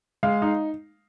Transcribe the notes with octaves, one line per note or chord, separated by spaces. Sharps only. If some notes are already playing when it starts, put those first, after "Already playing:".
G#3 F5
D#4